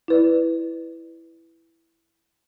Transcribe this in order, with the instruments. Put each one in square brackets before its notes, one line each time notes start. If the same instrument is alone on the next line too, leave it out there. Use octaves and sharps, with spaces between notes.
[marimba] E4 B4 D5